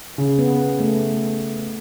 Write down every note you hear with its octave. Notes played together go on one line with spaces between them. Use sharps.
C#3
B3
A3